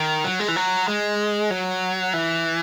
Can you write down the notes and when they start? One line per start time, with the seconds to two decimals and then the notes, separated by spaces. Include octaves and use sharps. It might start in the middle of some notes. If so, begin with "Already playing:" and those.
Already playing: D#3
0.24 F#3
0.40 G#3
0.48 E3
0.56 F#3
0.88 G#3
1.51 F#3
2.13 E3